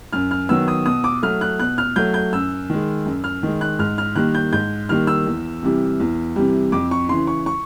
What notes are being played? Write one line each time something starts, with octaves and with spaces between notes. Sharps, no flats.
F#2 F6
F6
D#3 F#3 B3 E6
D#6
B2 D#6
D6
F#3 A3 F6
F#6
B2 F#6
F6
F#3 A3 G6
G6
F#2 E6
D#3 G#3
F#2
F6
D#3 G#3
F#6
G#2 F6
F6
D#3 G3 A#3 F#6
G6
G#2 G6
D#3 G3 A#3 F6
E6
E2
C3 E3 G3
E2
C3 E3 G3
F2 D6
C#6
C#3 E3 C6
C#6
C#6